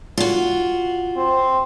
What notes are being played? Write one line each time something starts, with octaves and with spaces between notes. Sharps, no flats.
F4 F#4
C4